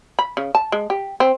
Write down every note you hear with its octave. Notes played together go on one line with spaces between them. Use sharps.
B5
C#3
A5
G#3
G4
C4